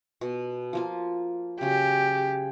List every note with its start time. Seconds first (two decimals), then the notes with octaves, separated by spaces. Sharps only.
0.21 B2
0.73 F3 A#3 F4
1.61 C#3 F#3 G4